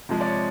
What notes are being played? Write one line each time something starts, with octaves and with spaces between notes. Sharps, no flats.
C3 F3 G#3
D5
C#5